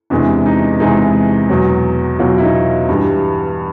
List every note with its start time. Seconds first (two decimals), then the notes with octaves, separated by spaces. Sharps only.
0.10 E2 C3 E3 G#3 D4
0.46 D#4
0.80 E2 C3 E3 G#3 D#4
1.49 E2 B2 F#3
2.19 E2 B2 F#3 F4
2.38 E4
2.42 D#4
2.89 G2 E3 G3